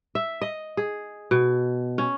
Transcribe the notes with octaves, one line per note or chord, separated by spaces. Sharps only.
E5
D#5
G#4
B2
C#4